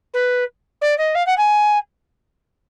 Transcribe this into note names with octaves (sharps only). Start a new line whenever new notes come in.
B4
D5
D#5
F5
F#5
G#5